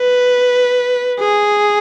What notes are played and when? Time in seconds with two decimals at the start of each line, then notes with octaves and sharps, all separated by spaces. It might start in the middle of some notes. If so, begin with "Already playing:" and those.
Already playing: B4
1.20 G#4